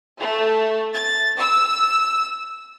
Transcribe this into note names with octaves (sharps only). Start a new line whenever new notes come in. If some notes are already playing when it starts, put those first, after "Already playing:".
A3
A6
E6